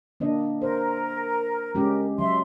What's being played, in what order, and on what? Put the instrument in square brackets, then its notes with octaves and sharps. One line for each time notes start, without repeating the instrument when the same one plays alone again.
[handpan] A#3 D4 D#5
[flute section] A#4 [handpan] C5
[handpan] G#3 C#4 G4
[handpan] F#3 [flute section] E5 C6